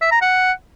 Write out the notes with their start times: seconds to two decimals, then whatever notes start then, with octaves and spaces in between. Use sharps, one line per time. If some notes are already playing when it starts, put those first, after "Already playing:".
0.01 E5
0.12 A#5
0.22 F#5